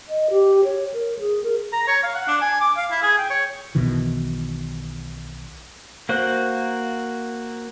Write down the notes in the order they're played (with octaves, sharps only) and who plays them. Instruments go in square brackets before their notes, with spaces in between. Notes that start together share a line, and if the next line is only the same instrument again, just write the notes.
[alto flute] D#5
G4
C#5
A#4
G#4
A#4
[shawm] A#5
C#5
F5
F#5
D4
G#5
D6
F5
E4
G#4
G5
C#5
[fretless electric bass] B1 B2 D#3 E3
[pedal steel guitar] A#3 F#4 C5 F#6